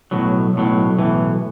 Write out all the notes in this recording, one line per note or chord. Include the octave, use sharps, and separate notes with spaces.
B1 A2 F#3
B1 A2 F#3
B1 A2 E3